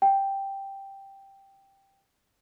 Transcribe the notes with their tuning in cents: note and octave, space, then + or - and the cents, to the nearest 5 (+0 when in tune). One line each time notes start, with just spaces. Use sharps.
G5 +0